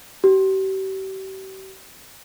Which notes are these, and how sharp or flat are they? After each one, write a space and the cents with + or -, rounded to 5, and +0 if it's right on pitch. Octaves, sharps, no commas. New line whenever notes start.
G4 -40